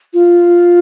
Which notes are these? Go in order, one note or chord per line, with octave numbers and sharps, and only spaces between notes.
F4